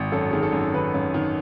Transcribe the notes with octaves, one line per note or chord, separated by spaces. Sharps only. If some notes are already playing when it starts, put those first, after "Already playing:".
Already playing: G#1
F#2 A4
D#3 G#4
A4
F#2
D#3 B4
F#2
D#3